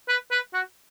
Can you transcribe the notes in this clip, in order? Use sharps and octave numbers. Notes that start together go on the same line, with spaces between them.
B4
B4
F#4